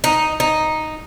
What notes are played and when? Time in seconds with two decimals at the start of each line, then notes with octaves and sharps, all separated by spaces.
0.04 D#4
0.40 D#4